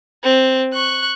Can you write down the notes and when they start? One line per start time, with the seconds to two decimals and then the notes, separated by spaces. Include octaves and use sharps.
0.23 C4
0.74 C#6 F#6